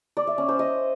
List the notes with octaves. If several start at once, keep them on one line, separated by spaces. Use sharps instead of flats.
D5
E5
C#4
C5
D#5